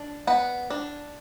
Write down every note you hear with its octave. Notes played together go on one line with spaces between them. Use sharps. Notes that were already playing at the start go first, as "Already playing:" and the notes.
Already playing: D4
B3 F#5
D4